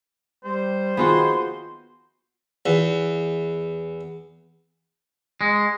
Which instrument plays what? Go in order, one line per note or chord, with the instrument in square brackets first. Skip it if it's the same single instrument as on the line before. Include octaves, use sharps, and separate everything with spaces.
[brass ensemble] G3 [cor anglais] C5
[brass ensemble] D#3 G#4 [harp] B3 F4 F#4 [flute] C6
[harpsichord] E2
[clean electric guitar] G#3